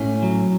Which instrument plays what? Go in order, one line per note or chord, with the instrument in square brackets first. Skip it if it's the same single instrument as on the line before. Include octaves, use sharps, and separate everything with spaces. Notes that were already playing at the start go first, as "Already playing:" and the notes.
Already playing: [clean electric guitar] A2 C#4
F#3